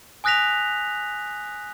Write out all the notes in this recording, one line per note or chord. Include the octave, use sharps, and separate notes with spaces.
G#5 D#6 F#6 A#6 B6 F7